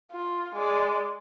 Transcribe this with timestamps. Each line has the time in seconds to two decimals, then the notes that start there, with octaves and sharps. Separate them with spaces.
0.12 F4
0.55 G#3 D5